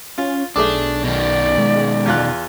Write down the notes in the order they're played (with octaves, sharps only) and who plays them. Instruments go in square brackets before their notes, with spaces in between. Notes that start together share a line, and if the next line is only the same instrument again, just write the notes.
[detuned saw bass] C#4 [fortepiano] F4
[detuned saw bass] B1 [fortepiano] A3 G#4 D6 [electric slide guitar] D4
[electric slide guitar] B2 D#3 [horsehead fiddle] D5
[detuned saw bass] G#3
[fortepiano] E2 F4 F#6